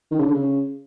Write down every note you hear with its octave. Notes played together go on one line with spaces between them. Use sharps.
D#3
C#3
D3
C#3